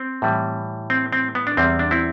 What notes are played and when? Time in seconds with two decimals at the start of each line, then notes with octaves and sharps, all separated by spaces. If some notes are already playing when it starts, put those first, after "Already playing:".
Already playing: C4
0.22 A2 E3 G3
0.90 C4
1.13 C4
1.35 B3
1.47 D4
1.57 E2 C3 G3 C4
1.79 D4
1.91 C4 E4